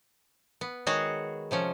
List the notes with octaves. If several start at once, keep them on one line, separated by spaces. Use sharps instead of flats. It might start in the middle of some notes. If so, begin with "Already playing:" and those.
B3
D#3 G#3 F#4 G#4 C#5
C3 F3 C#4